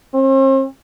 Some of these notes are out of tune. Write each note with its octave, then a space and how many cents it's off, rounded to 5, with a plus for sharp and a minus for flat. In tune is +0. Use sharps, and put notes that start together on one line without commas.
C4 +45